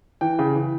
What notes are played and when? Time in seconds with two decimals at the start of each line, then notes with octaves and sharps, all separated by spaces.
0.21 E3 G5
0.39 C#3
0.55 E3